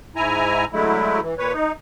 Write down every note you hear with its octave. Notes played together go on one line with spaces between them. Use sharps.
G#2 E4 G#5 A#5
D3 F#3 G#3 A3 E4
E3
A#2 B4 C#5
D#4